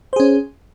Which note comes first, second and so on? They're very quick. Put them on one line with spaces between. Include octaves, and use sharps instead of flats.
C5 G#4 C#4